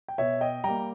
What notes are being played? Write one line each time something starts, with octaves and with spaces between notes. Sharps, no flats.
G5
B2 C#5 E5
D#5 G5
G3 A#3 G5 A#5